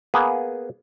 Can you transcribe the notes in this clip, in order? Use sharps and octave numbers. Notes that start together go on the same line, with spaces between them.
A#3 B3 G#4